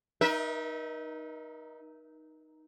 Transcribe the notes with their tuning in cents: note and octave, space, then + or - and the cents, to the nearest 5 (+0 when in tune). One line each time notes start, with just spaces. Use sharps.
D#4 -5 A#4 +40 E5 -30